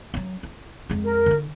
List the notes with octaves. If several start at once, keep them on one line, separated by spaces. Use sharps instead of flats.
F#3 C#4
E4
F2 G#3
A#4
D3 D#4